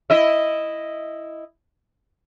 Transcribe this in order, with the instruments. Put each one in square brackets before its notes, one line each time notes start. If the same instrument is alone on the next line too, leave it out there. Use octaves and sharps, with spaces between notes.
[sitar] E4 D#5 E5